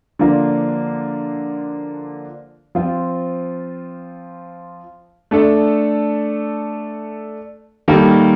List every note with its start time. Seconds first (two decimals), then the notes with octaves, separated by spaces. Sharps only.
0.19 D3 F3 A#3 D4 F4
2.75 F3 C4 F4
5.31 A3 D4 A4
7.88 D#3 G3 A#3 D#4 A4